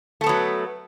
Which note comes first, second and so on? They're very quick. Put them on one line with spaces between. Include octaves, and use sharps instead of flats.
A3 A4 B3 F#3